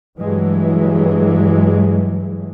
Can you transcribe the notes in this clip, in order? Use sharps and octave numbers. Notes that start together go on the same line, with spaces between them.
G2 E3 F#3 G#3